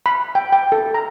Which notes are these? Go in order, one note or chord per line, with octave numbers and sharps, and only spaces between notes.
B5
G5
G5
A4
A#5